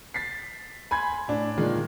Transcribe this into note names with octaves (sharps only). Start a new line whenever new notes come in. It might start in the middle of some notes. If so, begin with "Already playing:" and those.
A6 B6 C7
G#5 B5 C6 G#6
A2 D4
A#2 D#3 G#3